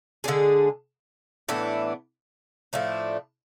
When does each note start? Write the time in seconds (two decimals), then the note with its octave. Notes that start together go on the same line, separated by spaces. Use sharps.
0.24 D3 G#3 D4 G#4
1.49 A2 E3 B3 D4
2.73 A2 F3 A3 D4